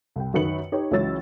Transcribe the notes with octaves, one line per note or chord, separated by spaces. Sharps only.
C2 G5
F#2 D#3 F#4 B4 C#7 F#7
D#4 G4 B4 C#5
C#2 E3 F#3 C#4 E6 A6